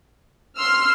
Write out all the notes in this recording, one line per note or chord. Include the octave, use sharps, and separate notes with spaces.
C6 E6 F6